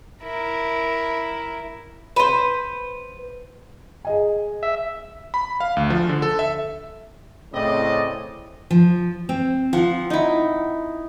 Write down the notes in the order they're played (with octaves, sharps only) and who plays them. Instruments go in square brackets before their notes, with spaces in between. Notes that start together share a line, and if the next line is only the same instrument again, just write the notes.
[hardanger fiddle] E4 A#4
[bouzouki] B4 C5
[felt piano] G#4 D#5 G#5
[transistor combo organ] E5
[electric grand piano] B5
F5
D2
F3
D3
A4
E5
[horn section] A2 C#3 C4 D5 D#5
[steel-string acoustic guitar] F3
C4
[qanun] F3 C4 [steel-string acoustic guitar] F#5
[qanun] D#4 E4